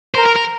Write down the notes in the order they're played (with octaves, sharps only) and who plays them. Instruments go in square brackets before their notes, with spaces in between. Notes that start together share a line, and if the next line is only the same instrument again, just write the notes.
[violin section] A#4 [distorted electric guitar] C5
[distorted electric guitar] A#4
A#4